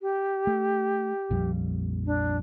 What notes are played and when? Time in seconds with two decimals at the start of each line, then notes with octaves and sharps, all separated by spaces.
0.01 G4
0.47 A3
1.31 A#1 F2 G3
2.06 D4